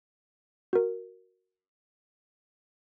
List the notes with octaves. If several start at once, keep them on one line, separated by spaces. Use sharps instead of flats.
F#4 A#4